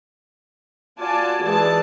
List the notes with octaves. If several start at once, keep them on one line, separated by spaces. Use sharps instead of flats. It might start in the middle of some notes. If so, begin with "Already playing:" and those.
F4 F#4 D5 G#5 A5
E3 G#3 G#4 D5 A5